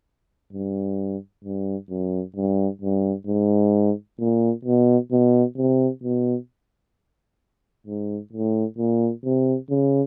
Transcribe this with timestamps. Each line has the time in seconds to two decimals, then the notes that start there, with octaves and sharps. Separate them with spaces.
0.53 G2
1.44 G2
1.90 F#2
2.36 G2
2.82 G2
3.27 G#2
4.19 A#2
4.65 B2
5.11 B2
5.57 C3
6.03 B2
7.87 G#2
8.33 A2
8.78 A#2
9.24 C3
9.70 C#3